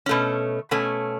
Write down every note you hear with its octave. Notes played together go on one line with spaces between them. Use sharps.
B2 A3 C#4
B2 A3 C#4